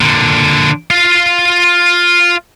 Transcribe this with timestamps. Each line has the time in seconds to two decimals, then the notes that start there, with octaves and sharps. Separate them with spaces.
0.01 A#2 D3
0.90 F4 F5